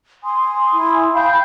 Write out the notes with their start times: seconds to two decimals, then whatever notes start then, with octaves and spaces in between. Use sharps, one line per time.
0.24 G#5 C6 D#6
0.73 E4
1.14 F5 G5 B5 G6